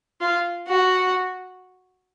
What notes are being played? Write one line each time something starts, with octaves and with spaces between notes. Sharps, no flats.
F4
F#4